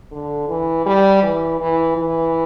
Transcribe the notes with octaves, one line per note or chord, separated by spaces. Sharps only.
D3
E3
G3
E3
E3
E3